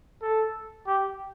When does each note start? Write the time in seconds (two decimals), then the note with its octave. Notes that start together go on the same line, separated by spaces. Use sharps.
0.22 A4
0.87 G4